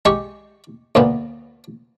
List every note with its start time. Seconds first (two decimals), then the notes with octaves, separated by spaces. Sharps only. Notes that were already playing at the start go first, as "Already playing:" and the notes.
0.05 G#3 G4 C#6
0.95 D2 A#2 B3